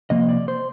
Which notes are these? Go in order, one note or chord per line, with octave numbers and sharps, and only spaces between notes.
C3 F3 A#3 D#5
D5
C5